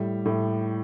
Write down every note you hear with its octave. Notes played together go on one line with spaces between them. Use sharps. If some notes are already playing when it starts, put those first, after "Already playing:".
Already playing: A2 G3
A2